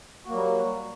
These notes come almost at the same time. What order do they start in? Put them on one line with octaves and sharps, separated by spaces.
F#4 A#3 F#3 G3